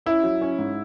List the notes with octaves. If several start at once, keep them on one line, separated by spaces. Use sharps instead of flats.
C#4 E4
F#3
C#4
G#2